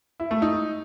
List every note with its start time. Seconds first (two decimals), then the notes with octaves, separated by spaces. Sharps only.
0.20 E4
0.31 A3
0.42 D#4